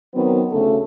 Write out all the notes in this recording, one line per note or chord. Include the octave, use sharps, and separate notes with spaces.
D#3 F#3 B3 C4
D2 C#3 A3 A4